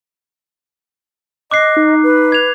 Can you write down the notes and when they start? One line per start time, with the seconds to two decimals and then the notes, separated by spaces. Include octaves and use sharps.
1.51 D#5 D6 F#6 C7
1.77 D#4
2.03 B4
2.32 G#6 F7